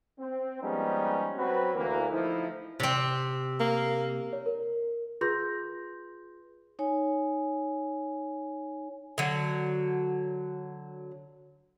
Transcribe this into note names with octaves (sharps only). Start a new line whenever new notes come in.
C4
F3 G3 G#3 B3 C#4 D#4
F#3 C4 F#4 B4
D2 E3 A#3
F3 A3 D#4 E4
C3 C4
A#3
C#5
A#4
F4 G#4 B4 C6 G6 A#6
D#4 C#5 G#5
D3 F#3